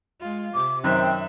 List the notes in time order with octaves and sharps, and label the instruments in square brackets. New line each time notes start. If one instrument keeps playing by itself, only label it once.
[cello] G#3 F4
[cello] C3 [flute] D6
[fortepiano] F#2 D#3 F#3 [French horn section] C4 [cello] E5 [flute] F#6